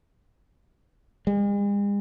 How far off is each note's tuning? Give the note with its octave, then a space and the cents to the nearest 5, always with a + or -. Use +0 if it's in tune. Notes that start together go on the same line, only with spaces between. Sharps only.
G#3 -45